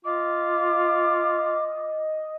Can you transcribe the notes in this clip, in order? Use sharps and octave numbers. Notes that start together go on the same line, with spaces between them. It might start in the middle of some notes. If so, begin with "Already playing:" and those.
F4 D#5 D6